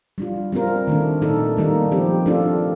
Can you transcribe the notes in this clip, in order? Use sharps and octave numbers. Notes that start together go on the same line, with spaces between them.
G3 D4 F4
G3 C4 F4 A#4
D#3 A3 D4
A#2 A3 D#4 A4
D#3 G3 A#3 D#4
F3 C4 G4
A3 D4 F4 A4